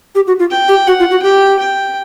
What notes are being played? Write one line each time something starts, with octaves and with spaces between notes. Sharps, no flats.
G4
F#4
F4
G5
G4
F#4 F#5
F4
F#4
G4 G5
G5